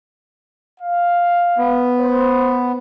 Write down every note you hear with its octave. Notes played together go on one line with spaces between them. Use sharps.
F5
B3
C5